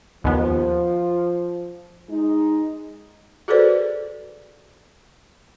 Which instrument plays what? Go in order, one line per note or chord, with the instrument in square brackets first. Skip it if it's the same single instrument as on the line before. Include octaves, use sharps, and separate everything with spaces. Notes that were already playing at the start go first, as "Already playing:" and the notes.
[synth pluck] D#2 B3 [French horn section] F3
[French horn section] G#3 D#4
[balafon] F#4 G#4 A4 B4 C5 D5